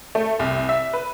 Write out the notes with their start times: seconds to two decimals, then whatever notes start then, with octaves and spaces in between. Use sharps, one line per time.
0.15 A3
0.39 C2
0.69 E5
0.93 B4